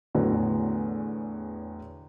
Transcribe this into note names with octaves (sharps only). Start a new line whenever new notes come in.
E2 A2 D3 F#3 B3